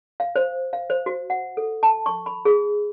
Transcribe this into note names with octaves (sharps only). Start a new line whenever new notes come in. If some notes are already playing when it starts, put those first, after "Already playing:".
F5
C5
F5
C5
F#4
F#5
A4
A5
C#6
B5
G#4